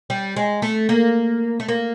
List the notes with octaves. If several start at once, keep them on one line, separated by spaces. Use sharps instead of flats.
G3
G#3
A3
A#3
A3
A#3